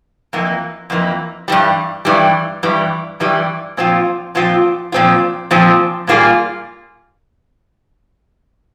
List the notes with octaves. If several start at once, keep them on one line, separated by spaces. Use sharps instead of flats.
F2 E3 A#3
F2 E3 A#3
G2 E3 G3
G2 E3 G3
G2 E3 G3
G2 E3 G3
A#2 F3 C4 F4
A#2 F3 C4 F4
A#2 F3 C4 F4
A#2 F3 C4 F4
A#2 G3 A#3 F4 G#4